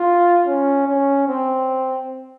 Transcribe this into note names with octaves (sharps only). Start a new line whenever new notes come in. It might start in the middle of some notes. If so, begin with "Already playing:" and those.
Already playing: F4
C#4
C#4
C4